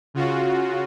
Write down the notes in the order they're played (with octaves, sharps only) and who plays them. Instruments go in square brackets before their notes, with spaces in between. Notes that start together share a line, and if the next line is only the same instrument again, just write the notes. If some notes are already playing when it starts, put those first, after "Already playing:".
[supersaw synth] C#3 F4 F#4